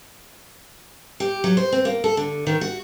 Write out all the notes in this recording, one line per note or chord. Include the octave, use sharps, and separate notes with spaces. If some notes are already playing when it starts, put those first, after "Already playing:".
G4
F#3
C5
C4
A#3
A4
D3
D#3
F#4